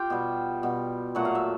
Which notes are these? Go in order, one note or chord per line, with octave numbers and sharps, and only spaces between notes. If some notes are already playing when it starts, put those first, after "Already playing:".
Already playing: F4 G4 F5 G5
B2 G3
B2 G3
A#2 F#3 A3 F#5
F5
E5